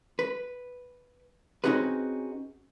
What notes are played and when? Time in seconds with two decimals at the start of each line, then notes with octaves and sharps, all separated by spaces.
0.19 B4
1.64 C4 C#4 D#4 F#4 G#4 B4